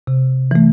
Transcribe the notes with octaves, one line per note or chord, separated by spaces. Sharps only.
C3
E3 A3